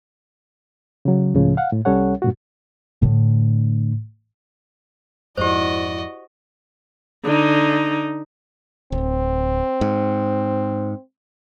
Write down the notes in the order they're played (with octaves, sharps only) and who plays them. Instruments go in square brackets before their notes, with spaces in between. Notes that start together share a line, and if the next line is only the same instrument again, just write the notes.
[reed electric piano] C#3 F#3
C#2 A2 C#3 F3
F5 F#5
A2
C2 G3 C#4 A4 C#5 F#5
G2 A#2 F#4
[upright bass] A2 D3
[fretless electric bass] F2 G#2 [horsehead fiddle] E4 D5 [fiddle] F#4 D#5 [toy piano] G4 C5
[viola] D3 D#4
[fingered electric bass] D1 [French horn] C4
[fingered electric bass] G#2